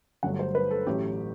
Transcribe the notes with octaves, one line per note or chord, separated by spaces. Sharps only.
G1 G2 F#3 A3 F#5
C5
B4
A4
A1 A2 F#3 A3 G4